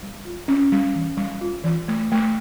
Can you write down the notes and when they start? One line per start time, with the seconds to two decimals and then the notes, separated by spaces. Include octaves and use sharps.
0.02 G3
0.25 F4
0.48 C#4
0.72 G3
0.95 E3
1.17 G3
1.41 F4
1.64 E3
1.88 A3
2.12 A3